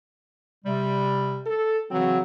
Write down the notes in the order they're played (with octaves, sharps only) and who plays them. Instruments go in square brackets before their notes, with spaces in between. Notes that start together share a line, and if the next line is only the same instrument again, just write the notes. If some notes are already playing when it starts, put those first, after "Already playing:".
[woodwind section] C3 G3
[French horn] A4
[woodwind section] C#3 E3 C4 [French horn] F#3